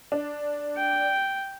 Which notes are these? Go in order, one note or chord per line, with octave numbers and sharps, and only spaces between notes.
D4
G5